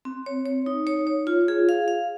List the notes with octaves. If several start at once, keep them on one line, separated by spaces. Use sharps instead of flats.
C4
C#5
C#5
D#4
C#5
C#5
F4
G#4
F5
F5